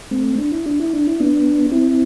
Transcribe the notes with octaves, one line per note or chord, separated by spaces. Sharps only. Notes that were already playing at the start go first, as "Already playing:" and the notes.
A3 C4
D4
E4
D4
E4
D4
E4
B3 D4
C4 E4